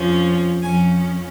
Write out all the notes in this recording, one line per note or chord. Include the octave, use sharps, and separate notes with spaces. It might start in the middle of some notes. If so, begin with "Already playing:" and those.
Already playing: F2 F3 C#4
F2 F3 C#4 G#5